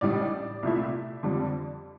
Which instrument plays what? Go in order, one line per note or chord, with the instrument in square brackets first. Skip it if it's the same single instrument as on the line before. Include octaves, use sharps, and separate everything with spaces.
[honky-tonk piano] A1 A2 G3 D4 D5
C2 A#2 A3 E4
F2 D3 G3 D4